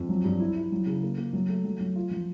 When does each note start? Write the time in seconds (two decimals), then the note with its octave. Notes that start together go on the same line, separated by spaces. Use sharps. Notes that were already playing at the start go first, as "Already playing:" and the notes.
Already playing: F2
0.09 F#3
0.24 G2
0.40 E4
0.56 E4
0.72 F#3
0.87 C#3
1.03 A#3
1.18 A#3
1.33 F#3
1.49 A3
1.65 F#3
1.81 F#3
1.96 F4
2.11 F3